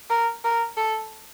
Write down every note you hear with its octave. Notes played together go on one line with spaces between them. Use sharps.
A#4
A#4
A4